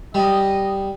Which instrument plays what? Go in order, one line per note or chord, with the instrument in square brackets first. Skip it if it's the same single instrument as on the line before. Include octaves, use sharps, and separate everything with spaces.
[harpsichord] G3 [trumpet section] D#5